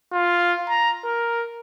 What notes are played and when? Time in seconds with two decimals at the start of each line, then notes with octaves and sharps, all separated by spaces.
0.13 F4
0.69 A#5
1.05 A#4